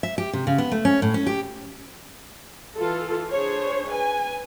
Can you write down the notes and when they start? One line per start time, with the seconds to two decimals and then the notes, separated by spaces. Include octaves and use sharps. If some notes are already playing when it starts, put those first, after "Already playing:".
0.03 E5
0.18 G4
0.33 C3
0.47 C#3
0.58 B3
0.72 A3
0.85 C#4
1.02 A2
1.14 C#4
1.27 G4
2.75 E3 F4 A4
3.31 D4 G#4 C5 C#5
3.89 B4 G#5